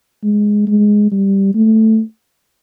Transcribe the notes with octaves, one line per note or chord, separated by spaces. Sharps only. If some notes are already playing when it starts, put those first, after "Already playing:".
G#3
G#3
G3
A3